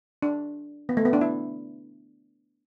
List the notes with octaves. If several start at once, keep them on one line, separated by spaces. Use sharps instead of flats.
D4
B3
A3
B3
D4
E4